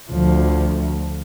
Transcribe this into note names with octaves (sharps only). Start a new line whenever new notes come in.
D2 F3